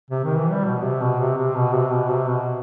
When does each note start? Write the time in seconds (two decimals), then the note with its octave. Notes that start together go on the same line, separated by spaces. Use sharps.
0.11 C3
0.24 D#3
0.38 E3
0.51 G3
0.66 B2
0.83 C3
1.02 B2
1.20 C3
1.37 C3
1.56 B2
1.74 C3
1.93 B2
2.10 C3
2.28 B2